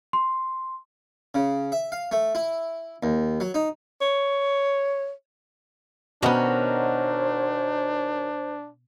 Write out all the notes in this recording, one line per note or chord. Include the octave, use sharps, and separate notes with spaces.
C6
C#3
E5
F5
A3
E4
D#2
F#3
D#4
C#5
B2 D#3 B3 C#4 D4 F#4 C5